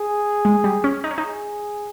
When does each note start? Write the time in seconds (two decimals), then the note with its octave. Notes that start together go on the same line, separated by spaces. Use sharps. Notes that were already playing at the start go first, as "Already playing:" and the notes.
Already playing: G#4
0.45 G#3
0.64 G3
0.84 C#4
1.04 D#4
1.11 C#4
1.18 D#4
1.24 G#4